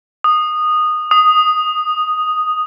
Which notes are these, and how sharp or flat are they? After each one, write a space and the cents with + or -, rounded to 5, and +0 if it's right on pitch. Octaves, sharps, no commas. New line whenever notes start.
D#6 -15
D#6 +0